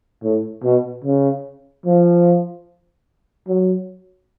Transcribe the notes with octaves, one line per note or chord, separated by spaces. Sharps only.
A2
B2
C#3
F3
F#3